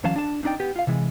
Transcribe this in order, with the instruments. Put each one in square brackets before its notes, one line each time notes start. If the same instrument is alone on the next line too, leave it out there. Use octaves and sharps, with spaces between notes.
[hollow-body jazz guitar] D2 E3 F#3 C#4 F5 A5
D4 A5
C4 D4 D#4 D5 G5
B3 G4
F4 F5
C3 E3 G#3